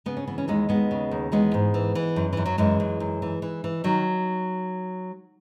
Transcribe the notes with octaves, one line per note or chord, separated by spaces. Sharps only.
C#3 B3
C#4
E3 B3
C#4
D#2 G#3 B3
D#2 G#3 B3
C#3
D#2
E3 G#3 B3
G#2
E3
E3
F#2
F#2 E3
F#3
F#2 E3 G#3
F#2
F#2
E3
E3
E3
D#3 F#3